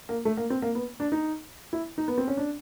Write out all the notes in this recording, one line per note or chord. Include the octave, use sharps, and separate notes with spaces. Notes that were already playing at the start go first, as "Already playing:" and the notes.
A#3
A3
A#3
C4
A#3
B3
D4
D#4
E4
D#4
B3
C4
C#4
D4